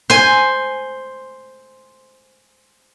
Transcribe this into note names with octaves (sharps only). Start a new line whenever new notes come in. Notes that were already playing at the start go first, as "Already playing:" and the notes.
C5 G#5